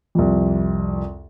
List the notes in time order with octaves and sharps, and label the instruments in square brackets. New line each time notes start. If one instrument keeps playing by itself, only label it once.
[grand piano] C2 F2